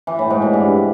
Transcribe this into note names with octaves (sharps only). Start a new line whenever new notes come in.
E3
A2
G#2
B2
G2